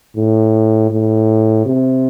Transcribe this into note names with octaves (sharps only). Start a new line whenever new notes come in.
A2
A2
C3